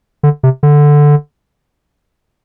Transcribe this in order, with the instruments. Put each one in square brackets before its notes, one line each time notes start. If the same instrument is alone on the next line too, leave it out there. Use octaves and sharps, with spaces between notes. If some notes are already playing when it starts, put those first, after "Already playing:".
[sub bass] D3
C3
D3